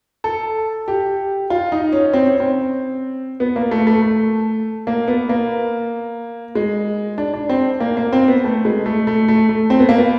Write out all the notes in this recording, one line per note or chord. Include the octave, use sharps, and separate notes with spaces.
A4
G4
F4
D#4
C#4
C4
C#4
C4
B3
A#3
A3
A3
A3
A#3
B3
A#3
G#3
D4
D4
C4
A#3
A#3
C4
B3
A3
G#3
A3
A3
A3
A3
C4
B3
A#3
B3